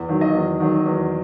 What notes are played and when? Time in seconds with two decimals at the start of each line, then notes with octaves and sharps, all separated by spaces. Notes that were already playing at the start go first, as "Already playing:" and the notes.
Already playing: E2
0.09 D#3 F#3
0.21 D#5
0.35 E2
0.60 D#3 F#3
0.86 E2